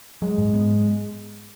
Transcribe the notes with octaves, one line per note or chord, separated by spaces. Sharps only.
F#3 G#3
G#2
B3